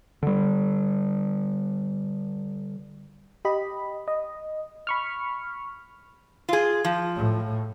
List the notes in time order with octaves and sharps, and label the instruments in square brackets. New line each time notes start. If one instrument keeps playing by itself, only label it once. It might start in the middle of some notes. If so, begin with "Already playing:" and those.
[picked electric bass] D3 G3
[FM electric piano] G4 D#5 B5
D#5
B5 C#6 F6
[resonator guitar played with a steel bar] F4 G#4
F3
[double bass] A2